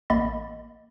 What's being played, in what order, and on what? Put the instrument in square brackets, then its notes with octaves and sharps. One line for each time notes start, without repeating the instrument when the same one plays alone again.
[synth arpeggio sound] A1 A#3 D#5 B5 A6